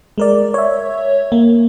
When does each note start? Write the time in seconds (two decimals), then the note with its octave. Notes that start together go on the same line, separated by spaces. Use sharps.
0.18 G#3 A#4 D5
0.54 C#5 E5
1.32 A#3